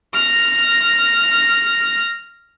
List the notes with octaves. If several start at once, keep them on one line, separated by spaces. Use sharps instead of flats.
F6 A#6